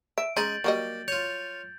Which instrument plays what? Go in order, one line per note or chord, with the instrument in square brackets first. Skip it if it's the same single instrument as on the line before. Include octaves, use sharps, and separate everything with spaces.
[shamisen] E5 [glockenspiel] D7
[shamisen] G#3 C#4 D#4 [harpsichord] G#4 [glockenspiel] G6 A6 F#7
[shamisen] F#3 G3 D#5 [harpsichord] A#3
[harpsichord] F4 C#5 [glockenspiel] G6